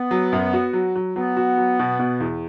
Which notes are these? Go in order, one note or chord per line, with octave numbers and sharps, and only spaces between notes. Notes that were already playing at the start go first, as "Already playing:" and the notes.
Already playing: B3
F#3
F#2
F#4
F#3
F#3
F#3 B3
F#4
F#3
B2
B2
E2